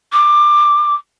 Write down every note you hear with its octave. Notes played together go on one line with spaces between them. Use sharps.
D6